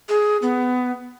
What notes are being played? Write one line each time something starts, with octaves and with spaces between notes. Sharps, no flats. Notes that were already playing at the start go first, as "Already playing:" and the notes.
G#4
B3